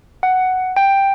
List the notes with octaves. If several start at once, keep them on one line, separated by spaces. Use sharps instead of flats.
F#5
G5